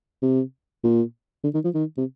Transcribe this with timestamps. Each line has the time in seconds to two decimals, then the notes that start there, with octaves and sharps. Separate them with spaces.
0.22 C3
0.84 A#2
1.44 D3
1.54 D#3
1.64 F3
1.75 D#3
1.97 C3